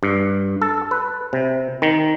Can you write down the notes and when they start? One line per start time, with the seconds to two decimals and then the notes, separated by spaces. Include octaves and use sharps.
0.03 G2
0.62 A4
0.91 B4
1.33 C3
1.82 D#3